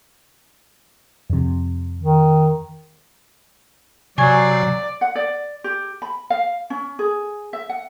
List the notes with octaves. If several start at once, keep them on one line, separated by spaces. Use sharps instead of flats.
F2 C3
D#3
C3 F#3 D5 G#5 C#6 G#6
F#5
D5
G4
B5
F5
C#4
G#4
E5
F#5